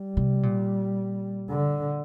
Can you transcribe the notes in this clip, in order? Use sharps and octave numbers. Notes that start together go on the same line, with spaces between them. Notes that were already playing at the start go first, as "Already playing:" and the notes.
Already playing: G3
C3
A#2
D3